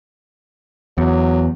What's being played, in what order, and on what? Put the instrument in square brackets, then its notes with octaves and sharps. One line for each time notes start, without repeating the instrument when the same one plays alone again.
[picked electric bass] E2 [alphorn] F#3